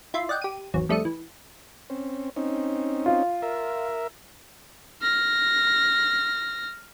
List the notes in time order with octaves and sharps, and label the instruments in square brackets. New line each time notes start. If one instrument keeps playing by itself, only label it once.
[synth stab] E4 F4 E5 C6
D5 D#5 F#5 G5
G4 D#7
G#1 E2 F#3
F2 G3 A3 D4 D#6 C#7
E3
[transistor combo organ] C4 C#4
C4 C#4 D#4
[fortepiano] F4
[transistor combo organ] A#4 E5
[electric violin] F6 A#6